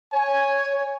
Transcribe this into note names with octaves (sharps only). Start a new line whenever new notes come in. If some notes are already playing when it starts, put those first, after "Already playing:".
C#5 G#5